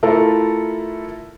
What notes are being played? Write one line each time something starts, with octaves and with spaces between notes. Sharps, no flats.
A3 E4 F4 A4 A#4